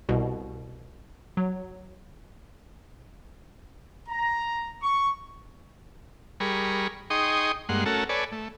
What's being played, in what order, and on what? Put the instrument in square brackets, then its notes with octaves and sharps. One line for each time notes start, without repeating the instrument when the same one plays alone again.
[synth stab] C2 B2
F#3
[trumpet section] A#5
C#6
[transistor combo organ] G3 G#4 A#4 B5 C#6
D#4 G#4 G5 C6 C#6 D#6
G2 G#3 A#3 F#5 C6
A3 C#4 F#4 A4 A#4
A4 B4 C#5 D5 G#5
A3